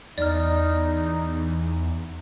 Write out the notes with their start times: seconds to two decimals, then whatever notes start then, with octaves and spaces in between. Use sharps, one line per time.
0.18 E2 D#4 D5 F6